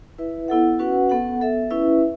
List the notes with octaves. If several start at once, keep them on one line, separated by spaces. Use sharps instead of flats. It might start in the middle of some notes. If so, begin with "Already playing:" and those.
E4 B4 E5
B3 E4 A4 F#5
C#4 F#4 B4 F#5
B3 A4 F#5
B3 A4 E5
C#4 E4 B4 E5